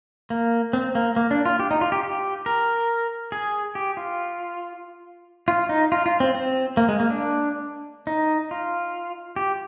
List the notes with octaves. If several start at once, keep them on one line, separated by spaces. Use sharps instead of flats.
A#3
C4
A#3
A#3
D4
F4
G4
D#4
F4
G4
G4
A#4
G#4
G4
F4
F4
D#4
F4
F4
C4
C4
A#3
G#3
A#3
D4
D#4
F4
G4